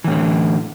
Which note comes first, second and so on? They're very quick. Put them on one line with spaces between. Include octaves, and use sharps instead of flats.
E3 A2 D3